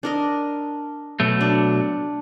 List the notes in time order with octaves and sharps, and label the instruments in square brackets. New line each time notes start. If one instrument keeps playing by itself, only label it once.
[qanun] D4 A#4 D#5
[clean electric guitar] B2 F#3 A3
[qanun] D4